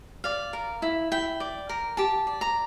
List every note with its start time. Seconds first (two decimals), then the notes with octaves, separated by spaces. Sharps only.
0.24 D5 F5
0.53 A#4
0.82 E4
1.12 E4 G5
1.40 D5
1.69 A#4
1.97 G4 A5
2.27 D5
2.41 A#5